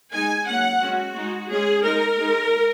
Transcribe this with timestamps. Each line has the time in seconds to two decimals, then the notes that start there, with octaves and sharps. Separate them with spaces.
0.13 G#3 D#4 G#5
0.48 F#3 A#3 C#4 F#5
0.81 G#3 C#4 F#4
1.15 G#3 D#4
1.50 G#3 C#4 G#4
1.83 G#3 D#4 A#4
2.18 G#3 D#4